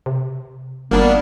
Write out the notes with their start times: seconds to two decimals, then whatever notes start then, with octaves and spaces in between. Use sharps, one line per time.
0.06 C3
0.91 G1 F#3 G3 A#3 B3 D4